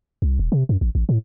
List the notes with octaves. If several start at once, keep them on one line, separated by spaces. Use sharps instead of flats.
C2
D#1
C3
F#2
A1
A1
A2